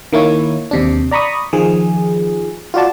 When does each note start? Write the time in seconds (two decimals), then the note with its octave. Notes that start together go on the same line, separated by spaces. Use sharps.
0.13 D#3 A#3 E4 C#5
0.71 D#2 C3 D4
1.11 D5 A#5 B5 C#6 D#6
1.53 D#3 F3 G#4
2.74 F4 F#4 D5 A5